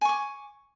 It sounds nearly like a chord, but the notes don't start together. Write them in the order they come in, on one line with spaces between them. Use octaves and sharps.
G#5 C#6 D6